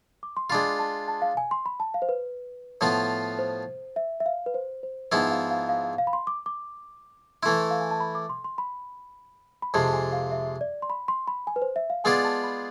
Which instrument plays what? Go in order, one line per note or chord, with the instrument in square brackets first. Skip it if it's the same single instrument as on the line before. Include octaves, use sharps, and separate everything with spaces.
[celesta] D6
C6
[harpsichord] G#3 D4 F4 [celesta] B5
[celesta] A5
A5
F5
G#5
C6
B5
A5
F5
C5
B4
[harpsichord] A2 F3 B3 F4
[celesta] C5
E5
E5
F5
B4
C5
C5
[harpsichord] G#2 F3 B3 E4 [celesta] B4
[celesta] F5
F5
F5
F5
F5
B5
C6
D6
D6
[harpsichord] E3 A3 E4 [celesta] C6
[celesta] F5
G#5
A5
B5
D6
C6
C6
B5
B5
[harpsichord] F2 C3 G#3 [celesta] A5
[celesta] A5
G#5
F5
E5
D5
C6
B5
C6
B5
G#5
B4
C5
E5
F5
[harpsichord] G#3 B3 F4 G#4 D5 [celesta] G#5
[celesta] A5
B5